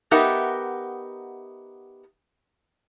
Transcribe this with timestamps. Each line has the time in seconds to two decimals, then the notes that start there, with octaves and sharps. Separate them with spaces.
0.11 B3 D#4 G4 A#4 E5 F#5